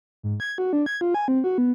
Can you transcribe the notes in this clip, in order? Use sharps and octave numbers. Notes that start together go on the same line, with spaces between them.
G#2
G#6
F#4
D4
G#6
F4
G#5
C4
F#4
B3